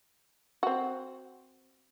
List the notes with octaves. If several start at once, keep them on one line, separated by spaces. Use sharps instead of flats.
C4 F#4